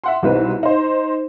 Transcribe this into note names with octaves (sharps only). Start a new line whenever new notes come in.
E5 F#5 C6
C2 B2 F#3 C4 D#4 B4
D#4 C5